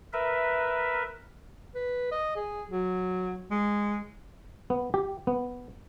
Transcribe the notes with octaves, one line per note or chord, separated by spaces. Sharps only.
A#4 B4 E5
B4
D#5
G#4
F#3
G#3
B3
G4
B3